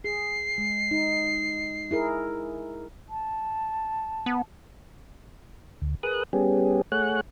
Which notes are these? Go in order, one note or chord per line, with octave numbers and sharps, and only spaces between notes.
G#4 C7
G#3
D#4
E4 G#4 A#4
A5
B3
D2
G#4 A#4 B4 D#6 F#6
G3 B3 C#4 G4 G#4
A3 G#4 C#5 F#5 F#6